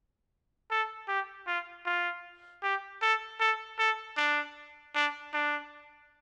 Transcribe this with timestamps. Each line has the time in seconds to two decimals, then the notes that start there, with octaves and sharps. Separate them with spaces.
0.71 A4
1.08 G4
1.47 F4
1.86 F4
2.63 G4
3.02 A4
3.40 A4
3.79 A4
4.17 D4
4.95 D4
5.34 D4